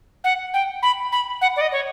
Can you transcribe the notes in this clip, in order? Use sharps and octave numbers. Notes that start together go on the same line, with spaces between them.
F#5
G5
B5
B5
F#5
D5
D#5
C#5